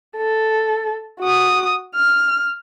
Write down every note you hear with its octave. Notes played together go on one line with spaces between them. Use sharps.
A4
F#4 D#6
F6